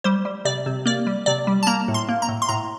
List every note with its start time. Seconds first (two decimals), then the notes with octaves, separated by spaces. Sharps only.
0.04 G3 C5
0.25 G3
0.45 C3 D5
0.66 C3
0.86 A#3 D5
1.07 G3
1.26 C3 D5
1.47 G3
1.63 A5
1.67 A#3 A#5
1.88 A2
1.94 C6
2.09 A#3
2.22 A#5
2.28 A2
2.42 C6
2.49 A2 A#5